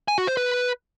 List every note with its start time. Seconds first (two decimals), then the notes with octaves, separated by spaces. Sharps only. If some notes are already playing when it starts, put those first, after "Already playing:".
0.08 G#5
0.18 F#4
0.27 C5
0.37 B4